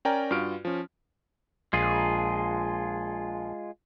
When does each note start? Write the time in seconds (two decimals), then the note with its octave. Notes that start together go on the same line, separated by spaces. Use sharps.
0.05 C#4 A#4 D5 G5 G#5 A#5
0.31 G2 F4 F#4 F6 D7
0.65 F3 C#4
1.73 A#1 G#3 F4 G#4